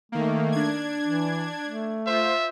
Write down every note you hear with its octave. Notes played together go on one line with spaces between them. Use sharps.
D#3 A3 A#3
D4 G#6
E3
A3
F4 C5 E5